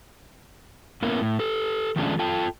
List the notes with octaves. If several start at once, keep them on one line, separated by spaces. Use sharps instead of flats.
A#3 B3 C#4 E4 A#4
A2
G4 A4
D#3 F3 G#3 A3 C#4 D4
F4 A4 G5 A5